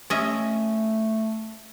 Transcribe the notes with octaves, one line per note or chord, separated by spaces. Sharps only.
A3 C#4 D#5 E5